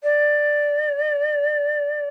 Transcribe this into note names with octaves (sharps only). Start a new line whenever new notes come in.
D5